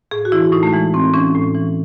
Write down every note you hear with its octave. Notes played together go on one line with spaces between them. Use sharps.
A2 G#4
F#4
E3 E4
A2 D#4
A3
E3 G#3
A2 C4
E3 C#4
A2
E3